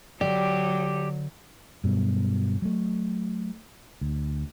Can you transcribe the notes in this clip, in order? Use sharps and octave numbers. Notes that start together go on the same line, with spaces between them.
D3 F#3 G4 D5
G2 B2 F#3
F#3 A3
D2